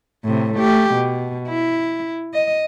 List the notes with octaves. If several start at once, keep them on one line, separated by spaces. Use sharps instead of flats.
A2 C3
A3 G4
B2
E4
D#5